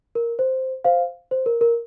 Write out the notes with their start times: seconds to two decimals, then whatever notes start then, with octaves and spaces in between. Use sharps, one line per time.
0.15 A#4
0.39 C5
0.84 C5 F5
1.31 C5
1.46 A#4
1.61 A#4